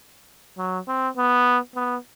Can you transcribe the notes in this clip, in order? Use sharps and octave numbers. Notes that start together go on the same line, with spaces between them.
F#3
C4
B3
B3